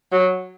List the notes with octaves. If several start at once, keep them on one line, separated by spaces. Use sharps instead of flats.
F#3